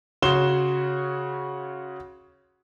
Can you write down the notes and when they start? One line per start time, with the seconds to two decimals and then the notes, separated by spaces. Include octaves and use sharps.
0.22 C#3 F#4 C#5 C6 E7 G7